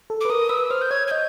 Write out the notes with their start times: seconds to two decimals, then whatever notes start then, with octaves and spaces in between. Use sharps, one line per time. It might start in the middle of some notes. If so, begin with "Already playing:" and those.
0.10 A4
0.21 B4 D6
0.30 A#4 D#6
0.49 B4 E6
0.71 C5 F6
0.82 G6
0.91 C#5 G#6
1.07 G#6
1.11 D#5 G6